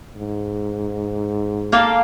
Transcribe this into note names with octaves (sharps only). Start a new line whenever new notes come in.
G#2
A#3 A4 F5